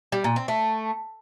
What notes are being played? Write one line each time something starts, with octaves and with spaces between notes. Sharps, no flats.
G3
A#2
C4
A3